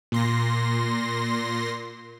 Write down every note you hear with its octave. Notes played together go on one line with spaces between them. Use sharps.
A#2 C6 A#6